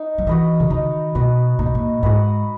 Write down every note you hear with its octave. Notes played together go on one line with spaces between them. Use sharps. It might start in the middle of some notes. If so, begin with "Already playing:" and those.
Already playing: D#4
F#3
E3 F#4 B4 D#5
C#3
D#3 D#4
B2 F#4 B4 D#5
A#2 D#4
B2
A#2
G#2 F#4 B4 D#5